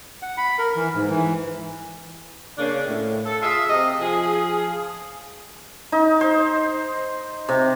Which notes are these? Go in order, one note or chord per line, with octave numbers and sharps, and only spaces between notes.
F#5
B5
A#4
E3
G#2
E3
C#3 A#3 C#4 D4
A2
A4
F4 G#4 E5
C3 D#5
F3 G#4
D#4
C5
C3